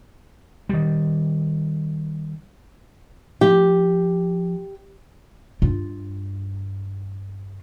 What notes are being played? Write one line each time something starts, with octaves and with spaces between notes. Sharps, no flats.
D#3 G3
F3 G4
G2 F4